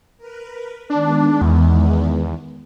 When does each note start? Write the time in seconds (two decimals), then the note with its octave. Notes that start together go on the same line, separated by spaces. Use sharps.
0.18 A#4 B4
0.90 D#3 G#3 B3 D4
1.41 E2